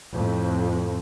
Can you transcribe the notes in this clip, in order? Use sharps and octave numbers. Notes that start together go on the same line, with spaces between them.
F2 A2